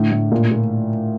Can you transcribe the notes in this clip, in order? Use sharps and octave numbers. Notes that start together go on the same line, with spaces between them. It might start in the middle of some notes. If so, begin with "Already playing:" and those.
Already playing: A2 D3
A2
A#2
A#2